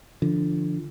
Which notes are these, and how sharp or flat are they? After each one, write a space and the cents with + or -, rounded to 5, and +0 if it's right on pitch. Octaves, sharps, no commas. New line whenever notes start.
D3 +0 F3 -25